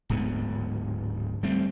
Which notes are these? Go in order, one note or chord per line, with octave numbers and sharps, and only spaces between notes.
D1 G#2 D3 B3
G3 A3 C4